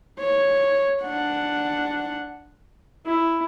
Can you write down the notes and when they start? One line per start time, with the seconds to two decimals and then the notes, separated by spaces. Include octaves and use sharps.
0.19 C#5
1.02 D4 F#5
3.06 E4